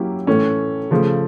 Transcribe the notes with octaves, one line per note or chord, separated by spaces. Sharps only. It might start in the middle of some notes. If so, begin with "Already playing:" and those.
Already playing: F#3 A#3 C#4 E4 G4
A2 E3 A3 C#4
C#3 F3 A3